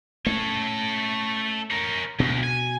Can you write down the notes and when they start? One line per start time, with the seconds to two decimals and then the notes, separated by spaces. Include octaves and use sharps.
0.26 A3 C4 C#4 A4 C#5
1.71 A#4 C#5
2.20 D2 B2
2.44 G#5